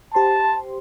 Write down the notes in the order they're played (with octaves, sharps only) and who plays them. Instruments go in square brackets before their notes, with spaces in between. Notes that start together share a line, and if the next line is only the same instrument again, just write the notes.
[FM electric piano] G4 C5 C6 [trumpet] A5